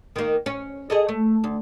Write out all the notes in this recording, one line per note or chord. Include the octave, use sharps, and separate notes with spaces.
D#3 A#3
C#4
G#4 A4 D#5
A3
D2